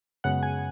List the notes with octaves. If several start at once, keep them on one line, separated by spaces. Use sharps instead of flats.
F#2 C#3 G#3 B3 F#5
G#5